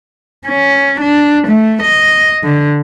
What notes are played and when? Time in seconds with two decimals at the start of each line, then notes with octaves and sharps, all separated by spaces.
0.48 C#4
1.01 D4
1.48 A3
1.84 D#5
2.44 D3